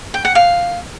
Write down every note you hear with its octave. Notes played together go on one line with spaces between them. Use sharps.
G5
F#5
F5